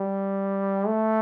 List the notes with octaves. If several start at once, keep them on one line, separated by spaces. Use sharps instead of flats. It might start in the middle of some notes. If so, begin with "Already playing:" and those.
Already playing: G3
A3